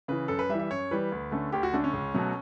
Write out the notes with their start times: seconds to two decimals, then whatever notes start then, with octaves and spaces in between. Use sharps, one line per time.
0.08 C#3 E3 B4
0.28 F#2 A4
0.39 B4
0.49 G3 E5
0.54 E3
0.59 E5
0.71 F#2 C#5
0.91 E3 G3 B4
1.12 D2
1.31 D3 A3 C#4
1.52 D2 G4
1.63 F#4
1.73 D3 A3 C#4 D4
1.84 C#4
1.93 C#2
2.14 B2 F#3 A3